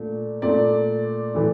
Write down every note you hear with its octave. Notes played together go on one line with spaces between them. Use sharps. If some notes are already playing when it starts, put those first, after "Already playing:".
Already playing: A#2 A3 D4
A#2 A3 D4 D5
A2 E3 A3